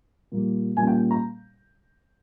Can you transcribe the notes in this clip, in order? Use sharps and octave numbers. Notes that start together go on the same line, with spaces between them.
A#2 G3 A#3
A#2 G3 A#3 C#4 G#5
G5
A#5